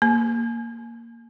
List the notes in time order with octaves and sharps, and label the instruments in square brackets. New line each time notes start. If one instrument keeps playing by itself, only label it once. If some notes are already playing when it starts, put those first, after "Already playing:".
[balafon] A#3